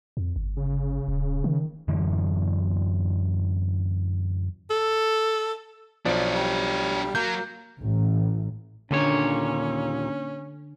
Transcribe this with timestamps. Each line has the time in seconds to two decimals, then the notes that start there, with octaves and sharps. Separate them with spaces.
0.17 F2
0.36 G1
0.57 C#3
1.08 D#1
1.44 D#3
1.88 F#2 D3 E3
4.70 A4
6.05 B1 F3 D4 C#5 D5
6.35 G3
7.15 F#3 A#3 G6
7.80 A1
8.91 D#2 A#2 D3 C#4 C#5